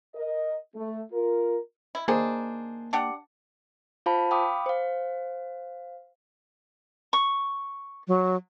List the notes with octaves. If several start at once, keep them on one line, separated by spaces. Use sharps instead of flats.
A#4 D#5
A3
F4 A#4
E4
D#3 A#3 D4 G#4 C5
D4 G4 F#5
F4 C5 F5 A5 B5
F5 G5 B5 D6 D#6
C5 F5
C#6
F#3